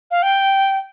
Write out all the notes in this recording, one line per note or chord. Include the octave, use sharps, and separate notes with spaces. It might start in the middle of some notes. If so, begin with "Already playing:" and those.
F5
G5